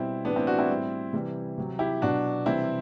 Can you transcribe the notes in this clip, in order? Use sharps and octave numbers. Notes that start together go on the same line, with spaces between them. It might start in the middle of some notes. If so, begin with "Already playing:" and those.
Already playing: B2 G3 C4 E4
A2 E3 G3 B3 D4
C4 E4
D4 F#4
C4 E4
A2 G3
C3 E3 G3
C3 F#3
E4 G4
B2 F#3 D4 F#4
C3 E3 G3 C4 E4